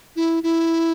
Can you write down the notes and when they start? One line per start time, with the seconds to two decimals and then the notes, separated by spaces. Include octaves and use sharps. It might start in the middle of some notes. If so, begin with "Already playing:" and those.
0.16 E4
0.43 E4